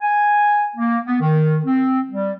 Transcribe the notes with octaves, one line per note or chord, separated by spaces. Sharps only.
G#5
A#3
B3
D#3
C4
G3